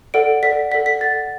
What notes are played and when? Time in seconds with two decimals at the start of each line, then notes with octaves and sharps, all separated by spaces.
0.14 A4 D5 F#5 D7
0.43 A4 D5 F#5 B6
0.71 A4 D5 F#5 B6
0.86 B6
1.00 A4 D5 F#5 A6